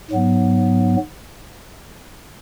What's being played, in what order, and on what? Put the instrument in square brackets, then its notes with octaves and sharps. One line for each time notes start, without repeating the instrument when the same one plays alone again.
[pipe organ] G#2 F#3 B3